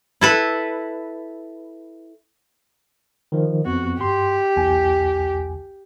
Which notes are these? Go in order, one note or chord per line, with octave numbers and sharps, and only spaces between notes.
E4 A4 B4
D#3 F3
F2 B3 F#4
G2 G4 C6
B1 E2 G#5